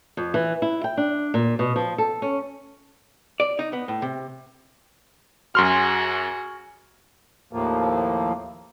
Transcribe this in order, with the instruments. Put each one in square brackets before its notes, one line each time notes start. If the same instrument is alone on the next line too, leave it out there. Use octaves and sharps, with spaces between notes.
[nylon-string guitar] F2
E3
E4
G5
D4
A#2
B2
F3
A4
C#4
[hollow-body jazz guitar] D5
D#4
B3
A2
C3
[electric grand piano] F#2 C6 F6 [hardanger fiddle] F#4 G#4
[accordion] D#2 A2 F3 A#3